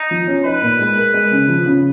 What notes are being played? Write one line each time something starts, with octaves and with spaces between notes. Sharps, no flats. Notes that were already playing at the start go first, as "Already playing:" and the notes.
Already playing: D#4
F3
C#4
D#4 B4
A#2
G#3
A#4
G#3
C#3
F3
C#3